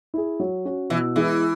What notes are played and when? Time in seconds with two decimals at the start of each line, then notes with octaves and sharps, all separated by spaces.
0.14 E4 G#4
0.40 F#3
0.65 C#4 F#4
0.90 B2 E3
1.16 E3 G#3 B3 E4 G#4